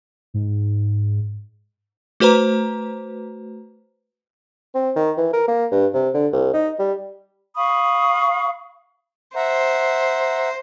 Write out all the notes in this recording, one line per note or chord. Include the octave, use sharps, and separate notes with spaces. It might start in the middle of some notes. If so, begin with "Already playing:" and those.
G#2
A3 F#4 B4 C5 A#5
C4
D#3
E3
A#4
A#3
G2
C3
D3
C2
D#4
G3
F5 B5 C#6 D#6
C5 E5 F#5 A#5